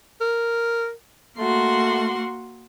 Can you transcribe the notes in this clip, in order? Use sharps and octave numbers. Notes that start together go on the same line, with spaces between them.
A#4
A3 A#3 F#4 C6